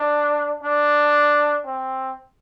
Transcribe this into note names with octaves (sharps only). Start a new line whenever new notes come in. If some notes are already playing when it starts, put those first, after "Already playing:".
Already playing: D4
D4
C4